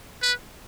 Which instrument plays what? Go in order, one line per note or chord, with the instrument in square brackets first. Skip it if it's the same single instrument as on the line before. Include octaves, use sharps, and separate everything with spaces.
[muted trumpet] B4